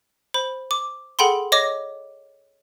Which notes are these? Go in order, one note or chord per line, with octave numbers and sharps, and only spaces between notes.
C5 B5
D6
G#4 A4 F#5 G5 B5 C6
C#5 D#5 D6 A#6